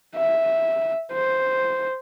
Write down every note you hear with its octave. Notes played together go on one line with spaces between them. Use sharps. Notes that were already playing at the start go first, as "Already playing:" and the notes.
E5
C5